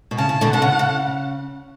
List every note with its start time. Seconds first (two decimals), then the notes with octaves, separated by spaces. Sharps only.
0.11 B2
0.18 C#3 A5
0.29 C#3
0.41 B2 D3
0.53 B2 D3 F#5
0.62 C#3
0.79 C#3